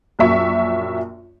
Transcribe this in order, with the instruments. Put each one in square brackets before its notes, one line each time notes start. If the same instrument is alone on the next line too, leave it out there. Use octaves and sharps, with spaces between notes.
[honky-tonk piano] A#1 F#2 E5 C#6